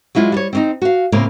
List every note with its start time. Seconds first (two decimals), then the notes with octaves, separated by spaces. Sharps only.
0.15 F#3 G#3 E4 F4
0.32 G3 C#5
0.53 C4 C#4 D#4
0.82 F#4 F5
1.12 A2 C#3 A#3 C4